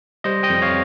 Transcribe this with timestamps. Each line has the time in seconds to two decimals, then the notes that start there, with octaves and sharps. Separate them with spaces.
0.24 G3 C5 D#5
0.43 D#5 G5
0.50 F2
0.62 C#5 F5